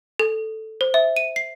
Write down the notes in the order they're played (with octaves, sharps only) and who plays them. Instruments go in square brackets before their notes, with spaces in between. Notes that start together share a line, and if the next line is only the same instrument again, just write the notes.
[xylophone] A4
C5
E5
D#7
C7